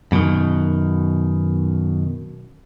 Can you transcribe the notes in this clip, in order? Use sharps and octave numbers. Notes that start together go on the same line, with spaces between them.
F#2 B2 D3 D#3